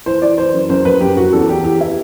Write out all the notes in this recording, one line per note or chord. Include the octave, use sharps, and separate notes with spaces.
E3 C5
E3 D5
E3 C5
F#2
F#2 C5
F#2 B4
F#2 G4
F#2 F#4
E2 A4
E2 G4
E3 G4
E3 E4